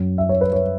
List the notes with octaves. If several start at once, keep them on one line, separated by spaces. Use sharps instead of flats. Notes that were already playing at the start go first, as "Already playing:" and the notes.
Already playing: F#2 F#3
E5
C#5
B4
C#5